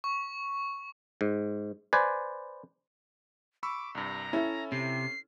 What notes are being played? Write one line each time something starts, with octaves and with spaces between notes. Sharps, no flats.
C#6
G#2
B4 C5 D5 G#5
B5 C#6 D6 E6
C2 G2 A#5
C#4 E4 A4
C3 C7